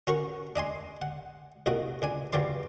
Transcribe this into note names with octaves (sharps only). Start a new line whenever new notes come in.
C#4 F#4 A#4 C#6
D4 D#5 G#5 C6
F#5
C2 A#2 F#4 D#5
C#2 D4 G#5
C#2 G2 F#3 G3 D5 C6